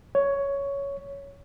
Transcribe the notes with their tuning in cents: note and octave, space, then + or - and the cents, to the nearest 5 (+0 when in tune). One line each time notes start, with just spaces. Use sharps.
C#5 +10